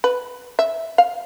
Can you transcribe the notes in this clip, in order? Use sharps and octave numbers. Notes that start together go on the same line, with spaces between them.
B4
E5
F5